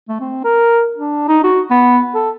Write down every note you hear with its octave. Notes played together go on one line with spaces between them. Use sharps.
A3
C4
A#4
D4
D#4
F#4
B3
A4